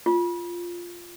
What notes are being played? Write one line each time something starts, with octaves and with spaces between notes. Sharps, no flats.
F4